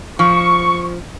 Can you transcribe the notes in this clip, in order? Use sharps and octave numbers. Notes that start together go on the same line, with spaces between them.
F3 C#6